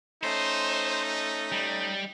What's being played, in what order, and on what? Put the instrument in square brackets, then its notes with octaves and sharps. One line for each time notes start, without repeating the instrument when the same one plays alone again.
[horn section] A3 C#4 D#4 [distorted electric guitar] C5
[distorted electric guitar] G3